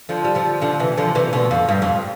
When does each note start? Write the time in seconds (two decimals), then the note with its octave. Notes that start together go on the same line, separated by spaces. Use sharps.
0.09 D3 F3
0.24 G3
0.35 D3 F3
0.61 D3 F3
0.80 C3 E3
0.97 D3 F3
1.15 C3 E3
1.33 B2 D3
1.51 F2
1.69 G2
1.82 F2